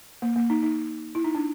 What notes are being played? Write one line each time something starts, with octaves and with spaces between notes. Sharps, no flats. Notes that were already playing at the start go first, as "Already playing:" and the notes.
A#3
A#3
D#4
D#4
E4
D#4
D4